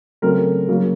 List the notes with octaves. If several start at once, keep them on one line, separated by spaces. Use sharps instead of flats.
C#3 F#3 A3 C4 A#4
C#3 F#3 A#3